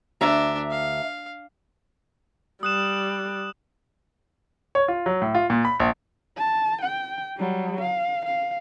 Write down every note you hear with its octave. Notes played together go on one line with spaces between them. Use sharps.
D2 D4 E5 A#5
F5
G3 D#6 F#6 E7
C#5
F4
F#3
A2
F4
A#2
B5
A#1
A5
G5
F#3 G3
F5
F5